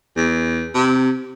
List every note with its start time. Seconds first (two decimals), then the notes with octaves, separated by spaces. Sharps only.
0.16 E2
0.74 C3